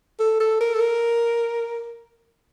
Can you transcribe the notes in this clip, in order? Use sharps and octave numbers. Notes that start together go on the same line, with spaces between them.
A4
A4
A#4
A4
A#4